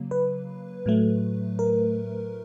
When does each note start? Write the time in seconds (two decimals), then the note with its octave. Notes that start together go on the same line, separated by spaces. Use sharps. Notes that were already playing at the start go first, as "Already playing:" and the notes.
Already playing: C#3 F#3 A#3
0.11 B4
0.86 A2 F#3 A3
1.59 A#4